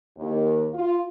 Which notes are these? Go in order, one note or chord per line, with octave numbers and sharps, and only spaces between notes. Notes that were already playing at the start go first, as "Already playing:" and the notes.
D#2
F4